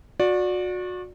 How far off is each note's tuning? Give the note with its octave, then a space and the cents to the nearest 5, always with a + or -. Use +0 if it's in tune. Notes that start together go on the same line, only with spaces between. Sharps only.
F#4 -30 D5 +0